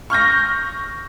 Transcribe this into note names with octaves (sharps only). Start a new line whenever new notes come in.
C#6 F6 G6 A#6